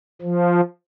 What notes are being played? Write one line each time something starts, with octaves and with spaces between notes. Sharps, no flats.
F3